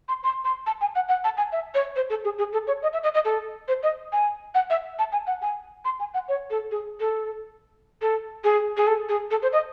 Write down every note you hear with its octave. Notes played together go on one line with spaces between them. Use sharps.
C6
C6
C6
A5
G#5
F#5
F#5
A5
G#5
E5
C#5
C5
A4
G#4
G#4
A4
C#5
D#5
E5
D#5
D#5
A4
C5
D#5
G#5
F#5
E5
A5
G#5
F#5
G#5
C6
G#5
F#5
C#5
A4
G#4
A4
A4
G#4
G#4
A4
G#4
A4
C5
D#5